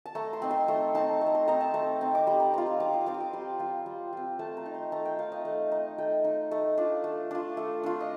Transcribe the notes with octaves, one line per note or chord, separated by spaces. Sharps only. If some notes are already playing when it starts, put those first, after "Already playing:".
A5
A3 A#5
C6
C4 D#4
C6
A3 C6
C4 D#4 A5
A3
A#5
C6
C4 D#4 A#5
A5
A3 A#5
C4 D#4
D6
G3 C6
A#5
C4 F4 A#5
A#5
G3 D6
D#6
C6
C4 F4 D6
D#6
D6
G3 C6
C4 F4
G3
C4 F4
A3 A5
A#5
D#4
C6
A3 A#5
G5
D#4 F5
D#5
A3
D#4
A3 G5
D#4
A3
D4 F4
A3
D4 F4
A3
D4 F4
D#5